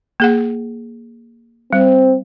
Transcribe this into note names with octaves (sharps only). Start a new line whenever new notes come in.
A#3 G#4 F#5
G3 C4